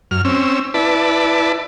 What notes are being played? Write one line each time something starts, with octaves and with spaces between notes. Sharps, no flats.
F#2 F6
C4 C#4 E6
E4 B4 D5 A5